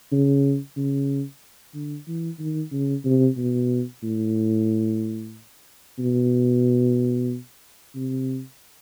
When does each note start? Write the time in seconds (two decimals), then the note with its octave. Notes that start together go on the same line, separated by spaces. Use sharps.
0.12 C#3
0.77 C#3
1.74 D3
2.08 E3
2.39 D#3
2.72 C#3
3.05 C3
3.37 B2
4.03 A2
5.99 B2
7.95 C3